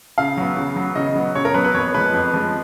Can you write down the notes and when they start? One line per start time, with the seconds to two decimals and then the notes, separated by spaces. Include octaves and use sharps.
0.18 C#3 F5
0.37 F#3 B3
0.57 C#3
0.76 F#3 B3
0.95 C#3 D#5
1.16 F#3 B3
1.35 C#3 C#5
1.45 A#4
1.54 F#3 B3 B4
1.64 B4
1.74 F2 C#5
1.95 F3 G#3 B4
2.14 F2
2.34 F3 G#3